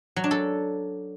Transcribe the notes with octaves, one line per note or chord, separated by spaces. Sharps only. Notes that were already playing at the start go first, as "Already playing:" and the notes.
F#3
D4
A4